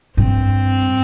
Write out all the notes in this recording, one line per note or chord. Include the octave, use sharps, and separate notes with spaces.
G2 C4